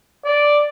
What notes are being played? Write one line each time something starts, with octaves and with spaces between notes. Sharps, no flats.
D5